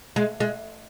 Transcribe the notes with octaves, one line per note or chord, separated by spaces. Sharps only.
G#3
G#3